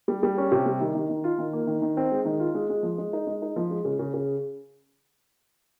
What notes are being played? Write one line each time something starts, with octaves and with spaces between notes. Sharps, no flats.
G3
G3
C#4
C3
G3
D#3
D#3
D#3
F4
D#3
A#3
D#3
D#3
C4
G#3
D#3
F4
G#3
G#3
F3
G#3
D#4
G#3
D#4
F3
G#3
C#3
C#3
C#3